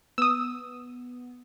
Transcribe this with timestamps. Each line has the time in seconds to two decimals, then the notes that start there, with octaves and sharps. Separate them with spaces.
0.18 B3 D#6 E6